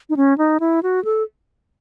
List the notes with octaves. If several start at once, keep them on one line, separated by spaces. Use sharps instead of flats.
D#4
C#4
D#4
E4
F#4
A4